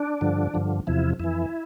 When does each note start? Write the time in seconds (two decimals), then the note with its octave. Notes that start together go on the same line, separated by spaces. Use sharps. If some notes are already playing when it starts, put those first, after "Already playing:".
Already playing: D4
0.21 G2 D3 F3
0.54 G2 D3 F3
0.87 E2 C3 F3 E4
1.20 F2 E3 E4